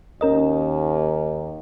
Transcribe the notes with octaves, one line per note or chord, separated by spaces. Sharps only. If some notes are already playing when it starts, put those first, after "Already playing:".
D#2 C#4 A#4 D#5